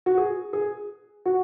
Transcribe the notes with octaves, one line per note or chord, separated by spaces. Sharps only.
F#4
G#4
G#4
F#4